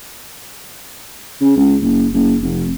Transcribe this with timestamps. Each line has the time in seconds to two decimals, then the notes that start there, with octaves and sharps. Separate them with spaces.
1.41 C#3
1.56 C#2
1.82 F#1
2.14 F#1
2.42 F1